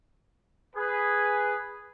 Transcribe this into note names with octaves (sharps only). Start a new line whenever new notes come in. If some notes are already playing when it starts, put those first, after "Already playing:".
G#4 B4